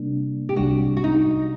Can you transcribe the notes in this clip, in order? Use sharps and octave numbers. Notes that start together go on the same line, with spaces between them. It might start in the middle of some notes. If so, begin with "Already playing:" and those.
Already playing: C3 G3 A#3 D4
G4
C2 C3 G3 D4 F#4
F#4
D#4